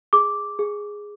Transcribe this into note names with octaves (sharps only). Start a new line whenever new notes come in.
G#4 D6
G#4